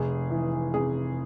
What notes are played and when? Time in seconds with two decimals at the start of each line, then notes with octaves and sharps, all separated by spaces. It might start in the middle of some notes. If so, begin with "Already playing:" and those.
Already playing: F1 G#4
0.30 E3
0.74 C3 G#4